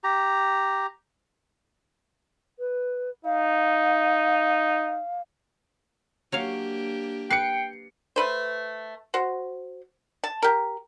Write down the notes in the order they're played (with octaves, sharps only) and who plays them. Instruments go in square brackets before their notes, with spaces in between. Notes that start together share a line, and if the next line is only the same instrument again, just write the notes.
[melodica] G4 A#5
[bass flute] B4
[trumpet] D#4 [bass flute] F5
[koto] F#3 C#5 F5 [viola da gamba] A#3 D4 G4
[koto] B4 [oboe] G5 [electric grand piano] C7 C#7
[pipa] A3 B4 C5
F#4 C5
A5
G4 A#4